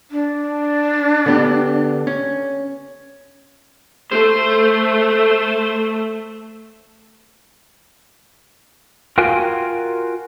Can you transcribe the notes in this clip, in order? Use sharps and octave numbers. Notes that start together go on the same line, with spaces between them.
D4
D3 B3 G4
C#4
A3 C5
F4 F#4 A#4 F5 G5 G#5